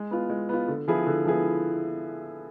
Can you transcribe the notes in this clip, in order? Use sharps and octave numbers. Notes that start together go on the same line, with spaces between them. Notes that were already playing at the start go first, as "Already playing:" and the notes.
Already playing: G#3
B3 F4
G#3
B3 F4
D3
F3 B3 E4 G#4
D3
F3 B3 E4 G#4